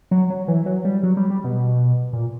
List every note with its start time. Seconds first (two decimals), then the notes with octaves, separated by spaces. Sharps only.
0.11 F#3
0.30 F#3
0.48 E3
0.66 F#3
0.85 G3
1.03 F#3
1.17 G3
1.30 G3
1.44 B2
2.13 A#2